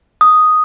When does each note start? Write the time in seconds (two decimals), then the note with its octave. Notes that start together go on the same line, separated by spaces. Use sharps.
0.21 D#6